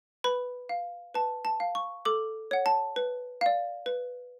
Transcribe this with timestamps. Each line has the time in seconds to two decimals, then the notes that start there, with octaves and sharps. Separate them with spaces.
0.24 B4 B5
0.69 F5
1.14 B4 A5
1.45 A5
1.60 F5
1.75 C#6
2.05 A4 D6
2.51 C#5 F#5
2.66 A5
2.96 B4
3.41 D5 F5
3.86 B4